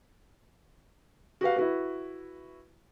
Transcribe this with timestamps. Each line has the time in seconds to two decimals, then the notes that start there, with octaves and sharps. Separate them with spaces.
1.41 F#4 G4 B4 F5
1.56 E4 F#4 B4